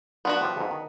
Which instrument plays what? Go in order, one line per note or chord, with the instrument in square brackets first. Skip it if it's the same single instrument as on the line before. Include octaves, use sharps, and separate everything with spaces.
[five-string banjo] B3 D4 F#4 [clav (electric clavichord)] F4
[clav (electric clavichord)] A2 F3 G3
F2 G#2
D#3